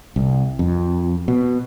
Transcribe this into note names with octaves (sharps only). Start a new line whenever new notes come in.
C2
F2
B2